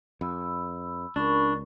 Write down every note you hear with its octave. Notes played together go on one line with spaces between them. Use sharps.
F2 B5 E6
C#2 D4 A#4 B5 C#6